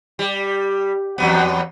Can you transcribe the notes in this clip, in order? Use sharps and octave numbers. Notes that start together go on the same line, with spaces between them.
G3
E2 F#3 B3